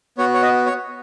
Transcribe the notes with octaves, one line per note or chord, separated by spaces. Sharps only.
B3 F#4 C#5
C#5
D#5
C#5